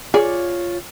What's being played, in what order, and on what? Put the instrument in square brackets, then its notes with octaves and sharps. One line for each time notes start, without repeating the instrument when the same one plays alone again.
[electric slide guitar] F4 C#5 [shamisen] G#4 D5